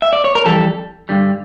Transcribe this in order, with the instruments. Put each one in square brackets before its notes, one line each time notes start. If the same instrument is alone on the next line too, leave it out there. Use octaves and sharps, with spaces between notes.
[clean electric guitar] E5
D5
C#5
A#4
F2 E3 G3 A4
G2 D3 G3